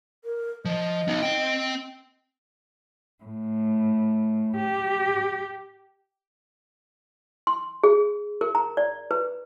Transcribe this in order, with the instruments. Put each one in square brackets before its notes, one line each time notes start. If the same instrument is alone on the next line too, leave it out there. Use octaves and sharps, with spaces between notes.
[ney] A#4
[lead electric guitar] F3 [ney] D#5
[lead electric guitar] B3 D#4
C4 G5
[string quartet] A2
G4
[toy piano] C6
G#4
A#4
A#5
D5
B4